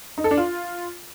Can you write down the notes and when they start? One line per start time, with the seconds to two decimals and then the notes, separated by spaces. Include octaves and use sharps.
0.18 D#4
0.24 A4
0.31 D4
0.38 F4